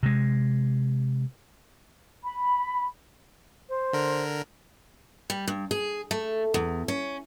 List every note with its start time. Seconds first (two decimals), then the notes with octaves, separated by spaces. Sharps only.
0.03 C3 G#3
2.24 B5
3.69 C5
3.93 D3 A#4
5.30 G3
5.48 G2
5.71 G#4
6.11 A3
6.54 E2
6.88 C#4